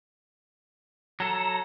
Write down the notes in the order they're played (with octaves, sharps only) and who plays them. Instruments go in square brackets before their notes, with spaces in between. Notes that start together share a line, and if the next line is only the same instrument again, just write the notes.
[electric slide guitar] F#3 A4 [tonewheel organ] A#5